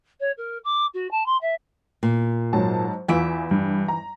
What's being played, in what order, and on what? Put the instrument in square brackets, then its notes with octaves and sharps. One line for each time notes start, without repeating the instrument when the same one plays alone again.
[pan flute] C#5
A#4
D6
F#4
A5
C6
E5
[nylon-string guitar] A#2
[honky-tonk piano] G#2 F#3 A5
[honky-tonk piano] E2 F4 D7 [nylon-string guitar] E3 E5
[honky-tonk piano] G2
A#5